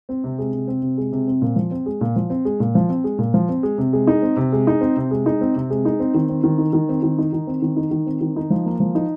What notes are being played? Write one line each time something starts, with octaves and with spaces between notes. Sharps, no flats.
C4
C3
G#3
C3
C4
C3
G#3
C3
C4
A#2
F3
C4
G#3
A#2
F3
C4
G#3
A#2
F3
C4
G#3
A#2
F3
C4
G#3
C3
G#3
D#4
C4
C3
G#3
D#4
C4
C3
G#3
D#4
C4
C3
G#3
D#4
C4
D#3
C4
D#3
D#4
D#3
C4
D#3
D#4
D#3
C4
D#3
D#4
D#3
C4
D#3
D#4
F3
A#3
F3
D#4